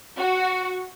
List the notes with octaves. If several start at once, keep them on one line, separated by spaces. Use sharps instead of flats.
F#4